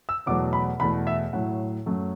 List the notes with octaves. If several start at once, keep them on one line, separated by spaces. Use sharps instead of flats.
E6
E2 B2 F#3 A3 D6
B5
E2 B2 A3 B5
E5
A2 F#3 A3 F#5
F#2 F#3 A3